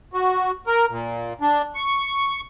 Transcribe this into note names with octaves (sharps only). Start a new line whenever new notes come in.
F#4
A#4
A#2
D4
C#6